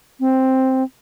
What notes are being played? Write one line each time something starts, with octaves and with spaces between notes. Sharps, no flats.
C4